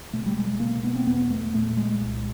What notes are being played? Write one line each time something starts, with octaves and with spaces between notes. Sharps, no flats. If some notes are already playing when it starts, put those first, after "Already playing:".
B2 A3
G3
G#3
B2 A#3
B3
C4
E2 B3
A3
A#2 A3
G#3
C2